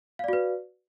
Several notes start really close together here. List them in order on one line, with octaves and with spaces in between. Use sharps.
F5 D5 F#4 B4